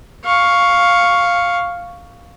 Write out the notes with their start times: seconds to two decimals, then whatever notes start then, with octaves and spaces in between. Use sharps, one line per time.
0.25 F5 C#6